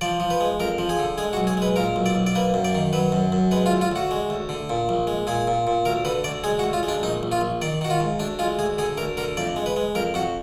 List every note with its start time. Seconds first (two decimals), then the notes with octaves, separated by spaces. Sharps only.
0.01 F3 D5
0.20 F3
0.30 B4
0.40 G#3
0.60 F2 A#4
0.78 F3
0.89 G#4
0.99 D3
1.18 G#3 G#4
1.33 F#4
1.37 B1
1.47 G#4
1.57 G#3 B4
1.76 A#2 A#4
1.96 B1
2.06 D5
2.15 B1
2.27 D5
2.35 A#3 B4
2.54 F#2
2.65 D5
2.75 D#3
2.93 F#3 B4
3.12 F#2
3.32 F#2
3.51 G#3 B4
3.66 F4
3.71 D2
3.81 F4
3.92 D2 F#4
4.11 G#3
4.30 D2
4.49 D3
4.69 A#2
4.89 A#1
5.07 G#3
5.27 A#2 G#4
5.47 A#2
5.67 A#2
5.85 D2 A#4
6.05 D3 B4
6.24 D2 D5
6.44 G#3 G#4
6.59 F#4
6.64 D2
6.73 F4
6.83 G#3
6.88 D4
7.03 A#1 D#4
7.23 A#1
7.32 F4
7.41 A#1
7.61 D#3 D5
7.81 D#3 F#4
7.90 F4
8.00 G#2
8.19 D2 D4
8.39 G#3 F4
8.59 D2 G#4
8.78 D3 G#4
8.98 D2 A#4
9.17 D3 A#4
9.37 F2 D5
9.56 G#3
9.66 B4
9.76 G#3
9.95 F2 A#4
10.14 F2 F#4